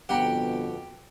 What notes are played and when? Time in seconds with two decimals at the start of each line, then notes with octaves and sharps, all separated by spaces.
0.09 G1 F2 B2 G4 F#5 G5 A#5